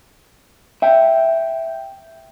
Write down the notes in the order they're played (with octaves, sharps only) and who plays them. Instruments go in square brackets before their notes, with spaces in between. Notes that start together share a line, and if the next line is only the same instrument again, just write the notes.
[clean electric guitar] E5 G5